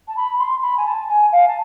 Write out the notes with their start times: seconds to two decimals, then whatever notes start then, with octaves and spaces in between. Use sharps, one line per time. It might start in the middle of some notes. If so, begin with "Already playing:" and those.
0.08 A5
0.17 B5
0.40 C6
0.63 B5
0.77 G#5
0.86 A5
1.09 G#5
1.32 F5
1.48 A5